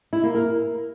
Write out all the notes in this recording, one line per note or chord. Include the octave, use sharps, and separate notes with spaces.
E4
A#3
A#4